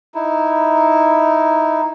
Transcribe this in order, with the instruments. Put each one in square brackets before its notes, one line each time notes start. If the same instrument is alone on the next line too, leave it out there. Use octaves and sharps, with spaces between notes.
[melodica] D#4 E4